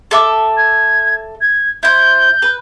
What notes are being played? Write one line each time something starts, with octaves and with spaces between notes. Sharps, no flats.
A4 E5 D6
G#6
G#6
E4 C5 G6
B4